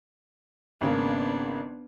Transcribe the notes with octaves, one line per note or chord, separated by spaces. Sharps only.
G#1 C#3 A#3 B3 D4